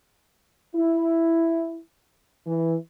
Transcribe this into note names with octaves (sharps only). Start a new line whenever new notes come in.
E4
E3